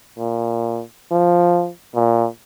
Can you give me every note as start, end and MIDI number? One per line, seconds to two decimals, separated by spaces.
0.18 0.82 46
1.11 1.70 53
1.95 2.26 46